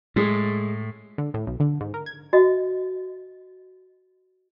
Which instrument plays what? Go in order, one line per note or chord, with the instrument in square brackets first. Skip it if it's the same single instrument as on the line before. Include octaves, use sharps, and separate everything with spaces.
[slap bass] A2 [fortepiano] G#3
[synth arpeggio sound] D3
A2
B1
D3
G#2
A#4
G#6
[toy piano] F#4 D#5 E5